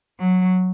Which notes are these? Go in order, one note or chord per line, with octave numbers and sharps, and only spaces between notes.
F#3